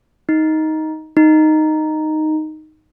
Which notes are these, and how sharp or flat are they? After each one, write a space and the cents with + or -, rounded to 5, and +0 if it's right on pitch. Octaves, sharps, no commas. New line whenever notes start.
D#4 +10
D#4 -5